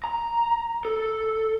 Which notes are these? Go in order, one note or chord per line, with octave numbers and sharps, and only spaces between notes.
A#5
A4